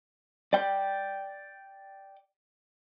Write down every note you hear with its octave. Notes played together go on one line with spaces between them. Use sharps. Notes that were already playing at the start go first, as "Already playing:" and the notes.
D5 G5